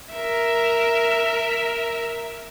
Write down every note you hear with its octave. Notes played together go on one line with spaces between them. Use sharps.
A#4 E5